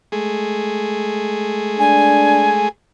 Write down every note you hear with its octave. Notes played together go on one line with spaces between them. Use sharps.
G#3 A3 G#4
D4 G#5